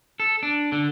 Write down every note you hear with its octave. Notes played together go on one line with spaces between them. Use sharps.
A4
D4
D3